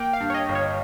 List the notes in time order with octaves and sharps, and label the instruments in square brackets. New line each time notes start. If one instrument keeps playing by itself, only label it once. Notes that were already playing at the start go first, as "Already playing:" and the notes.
Already playing: [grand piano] A#3 [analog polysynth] G5
[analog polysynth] F5
[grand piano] G2
[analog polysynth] C#5
D#5
[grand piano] G1
[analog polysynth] C#5